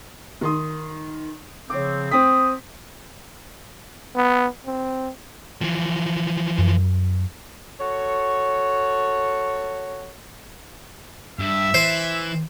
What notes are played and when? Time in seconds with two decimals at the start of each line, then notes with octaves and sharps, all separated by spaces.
0.41 D#3 C6 D#6
1.70 C#3 F3 C4 C#5 D6
2.11 C4 G5 D#6 B6
4.16 B3
4.66 C4
5.61 E3 F3
6.59 F#2
7.80 F#4 A4 C#5
11.39 G2 E5
11.74 E3 C5